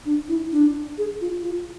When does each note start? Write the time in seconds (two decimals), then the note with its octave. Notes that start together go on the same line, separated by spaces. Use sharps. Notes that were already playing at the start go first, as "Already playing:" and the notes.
0.06 D4
0.28 E4
0.52 D4
0.98 G#4
1.21 F4
1.43 F4